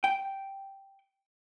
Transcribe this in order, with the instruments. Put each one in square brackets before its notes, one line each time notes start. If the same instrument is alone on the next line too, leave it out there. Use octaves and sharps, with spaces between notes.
[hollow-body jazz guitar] G5